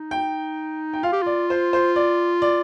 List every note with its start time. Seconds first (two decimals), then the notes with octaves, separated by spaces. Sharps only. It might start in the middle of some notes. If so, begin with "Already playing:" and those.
Already playing: D#4
0.11 G5
0.93 G5
1.03 F4 F5
1.13 G4
1.23 F4 D5
1.50 C5
1.73 C5
1.96 D5
2.42 D5